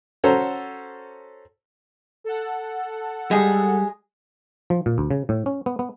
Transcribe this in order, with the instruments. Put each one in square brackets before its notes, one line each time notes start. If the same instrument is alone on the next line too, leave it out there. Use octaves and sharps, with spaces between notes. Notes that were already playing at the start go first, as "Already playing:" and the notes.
[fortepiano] C#4 F#4 A4 C5 A#5
[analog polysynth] A4 F#5
[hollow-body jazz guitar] G3 [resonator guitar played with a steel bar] G#3 G#4
[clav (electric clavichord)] F3
A#2
D2
C#3
A2
C#4
B3
B3